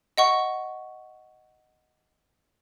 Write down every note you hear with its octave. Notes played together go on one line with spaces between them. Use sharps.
D#5 F#5 C#6